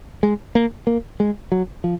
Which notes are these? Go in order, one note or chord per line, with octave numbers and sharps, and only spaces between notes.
G#3
A#3
A#3
G#3
F#3
F3